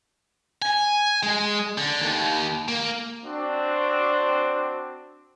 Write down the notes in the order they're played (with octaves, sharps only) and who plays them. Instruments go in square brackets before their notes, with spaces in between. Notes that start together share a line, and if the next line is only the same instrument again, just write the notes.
[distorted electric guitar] G#5
G#3
D3
D#2
A#3
[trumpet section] C4 D4 F#4